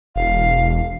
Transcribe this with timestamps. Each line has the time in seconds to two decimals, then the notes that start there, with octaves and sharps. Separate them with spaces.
0.16 E1 F5